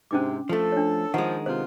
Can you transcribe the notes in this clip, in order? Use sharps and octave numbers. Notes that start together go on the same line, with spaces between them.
G#2 C3 C#4 D4 D6
F3 A3 A4
D4 C#5
D#3 F3 G#3 F#5
C3 B3 F4 C5